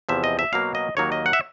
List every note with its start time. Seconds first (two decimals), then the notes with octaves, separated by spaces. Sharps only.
0.09 E2 C3 F3 E5
0.24 D#5
0.39 E5
0.53 B2 F#3 A#3 F5
0.75 D#5
0.97 D#2 D#3 F#3 A#3 C#5
1.12 D#5
1.26 F#5
1.33 E5